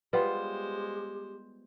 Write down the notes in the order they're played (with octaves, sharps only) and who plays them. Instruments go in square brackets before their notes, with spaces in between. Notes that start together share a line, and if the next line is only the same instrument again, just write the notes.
[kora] G3 B3 F4 [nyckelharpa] G#3 C5 [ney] G4 [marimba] B4